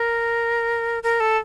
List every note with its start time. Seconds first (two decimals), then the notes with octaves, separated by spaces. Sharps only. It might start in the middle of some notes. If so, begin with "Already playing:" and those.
Already playing: A#4
1.03 A#4
1.20 A4